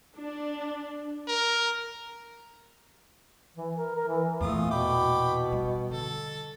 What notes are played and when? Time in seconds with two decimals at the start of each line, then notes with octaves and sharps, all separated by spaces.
0.17 D4
1.28 A#4
3.57 E3
3.76 A#4
3.95 A#4
4.08 E3
4.41 E2 A#2 A3 F4 D#6
4.71 B2 G5 B5 D6
5.52 G3
5.91 D3 A4